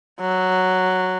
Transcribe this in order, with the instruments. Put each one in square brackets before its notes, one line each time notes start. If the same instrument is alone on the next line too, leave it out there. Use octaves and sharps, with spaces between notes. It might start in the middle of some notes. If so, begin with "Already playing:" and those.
[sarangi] F#3